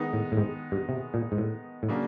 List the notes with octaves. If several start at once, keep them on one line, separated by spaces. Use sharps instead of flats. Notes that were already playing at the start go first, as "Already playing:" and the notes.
Already playing: D#3 G#3 B3 D#4
A2
A2
G#2
G2
C3
A#2
G#2
A2
A2
C#3 F#3 A#3 D4